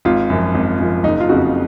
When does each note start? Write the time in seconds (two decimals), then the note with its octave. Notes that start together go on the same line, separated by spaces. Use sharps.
0.05 G#1 F4
0.30 F#2 F3
0.55 G#1
0.80 F#2 F3
1.04 F#1 D#4
1.20 F4
1.29 F2 C#3 F#4